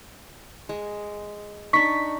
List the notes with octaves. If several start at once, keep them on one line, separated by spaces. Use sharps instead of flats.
G#3
D4 D#4 C#6 B6